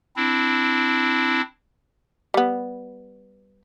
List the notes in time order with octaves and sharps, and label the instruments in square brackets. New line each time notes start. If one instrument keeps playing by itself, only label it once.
[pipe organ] C4 D4 E4
[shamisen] G3 B3